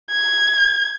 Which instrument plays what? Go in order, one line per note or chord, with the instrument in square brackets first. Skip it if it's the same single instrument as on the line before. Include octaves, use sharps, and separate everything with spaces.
[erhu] G#6